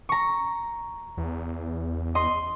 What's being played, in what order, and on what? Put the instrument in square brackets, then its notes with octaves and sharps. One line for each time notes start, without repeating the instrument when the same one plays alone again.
[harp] A#5 C#6
[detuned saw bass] E2
[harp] D#5 C6